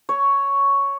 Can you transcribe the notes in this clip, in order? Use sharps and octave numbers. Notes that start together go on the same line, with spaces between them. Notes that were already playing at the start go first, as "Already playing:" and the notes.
C#5